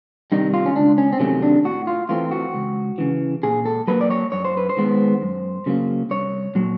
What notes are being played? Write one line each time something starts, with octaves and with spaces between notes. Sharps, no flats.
C3 D#3 G3 D#4
F4
C#4
C#2 D4
C#4
C4
C3 D#3 F#3 A3 C#4
D4
A2 F#4
F4
E3 A3 C4 F4
F#4
C#2
C#3 E3
A#2 G#4
A4
F#3 A#3 B4
D5
C#5
F#2 C#5
C5
B4
C5
D#3 G#3 B3
F#2
C#3 F#3 A#3
C2 C#5
A#2 F#3